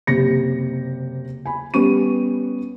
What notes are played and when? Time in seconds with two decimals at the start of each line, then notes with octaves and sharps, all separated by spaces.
0.07 F#1 C3 G4 A#6 C#7
1.46 G#5 B5
1.74 G3 B3 C#4 C#6 D#7